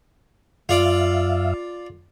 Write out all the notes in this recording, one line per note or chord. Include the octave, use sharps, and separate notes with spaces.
F#2 F4 D5 E5 F5